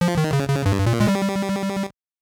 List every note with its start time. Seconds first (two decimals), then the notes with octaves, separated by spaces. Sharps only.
0.01 F3
0.17 D#3
0.33 C#3
0.49 C#3
0.66 G2
0.86 A#2
1.00 G#3
1.08 G3